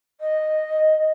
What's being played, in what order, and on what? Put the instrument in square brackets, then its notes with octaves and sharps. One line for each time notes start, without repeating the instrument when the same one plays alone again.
[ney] D#5